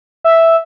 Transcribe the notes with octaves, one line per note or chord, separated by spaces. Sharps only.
E5